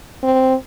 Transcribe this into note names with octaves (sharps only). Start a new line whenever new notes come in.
C4